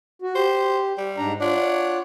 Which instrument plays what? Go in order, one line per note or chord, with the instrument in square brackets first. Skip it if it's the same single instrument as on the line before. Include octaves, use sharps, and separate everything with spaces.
[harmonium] F#4
[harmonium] G4 [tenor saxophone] C5
[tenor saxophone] G3
[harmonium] G#2 D4 A#5
[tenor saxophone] D4 [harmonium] F4 C#5 F#5